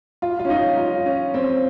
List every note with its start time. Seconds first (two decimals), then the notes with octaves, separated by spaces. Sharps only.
0.22 F4
0.39 F4
0.45 C#4
0.50 D#4
0.77 F4
1.06 C#4
1.34 C4